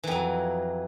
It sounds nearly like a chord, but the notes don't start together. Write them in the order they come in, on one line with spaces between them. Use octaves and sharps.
E3 F2 F#3